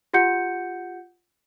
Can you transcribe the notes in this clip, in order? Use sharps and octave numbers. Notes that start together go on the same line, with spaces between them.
F4 G4 F#5 G6 C#7